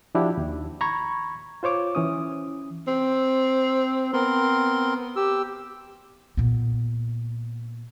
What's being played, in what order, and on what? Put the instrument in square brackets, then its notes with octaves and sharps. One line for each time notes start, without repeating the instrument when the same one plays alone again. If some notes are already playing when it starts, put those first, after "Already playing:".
[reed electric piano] F3 D4 E4 F#4 G4
D#2
A#5 B5 C#6 G#6
F4 C5 C#5 D6
E3 C#4 D#6
[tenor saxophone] C4
[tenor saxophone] B3 [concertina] C4 A#4 C6
[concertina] G4 E6
[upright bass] A#2 B3